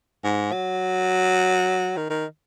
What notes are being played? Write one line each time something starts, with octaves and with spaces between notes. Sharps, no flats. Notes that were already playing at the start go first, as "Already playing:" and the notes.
G#2
F#3
D#3
D#3